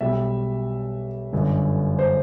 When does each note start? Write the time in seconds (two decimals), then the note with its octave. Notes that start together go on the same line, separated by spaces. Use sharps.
0.01 B1 B2 G3 E5
1.33 G1 F#2 D3
1.99 C5